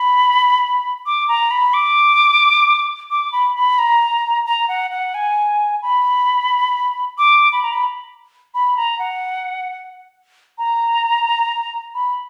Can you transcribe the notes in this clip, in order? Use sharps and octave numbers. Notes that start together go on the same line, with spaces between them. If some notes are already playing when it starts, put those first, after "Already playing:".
Already playing: B5
D6
A#5
B5
D6
D6
B5
B5
A#5
A#5
F#5
F#5
G#5
B5
D6
B5
A#5
B5
B5
A#5
F#5
A#5
B5